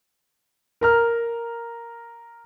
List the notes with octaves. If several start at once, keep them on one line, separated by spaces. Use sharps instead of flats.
A#4 A#5 F6